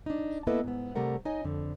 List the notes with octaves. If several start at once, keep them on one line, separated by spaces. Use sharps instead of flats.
D4 D#4
A#3 B3 E4 A4 B4 D#5
G#2 B3
C3 G3 A3 A#4 F#5
D#4 C#5 D#5 G#5
F2 D3